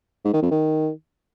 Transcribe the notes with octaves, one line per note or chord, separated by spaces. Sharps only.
G#2
D#3
F2
D#3